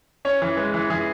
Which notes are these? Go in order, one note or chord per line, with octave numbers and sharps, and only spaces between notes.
C#4 C#5
E3
G#3 B4
E3
E3 G#4